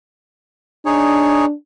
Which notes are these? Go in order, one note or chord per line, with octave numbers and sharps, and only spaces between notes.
D4 D#4 G#4 C#5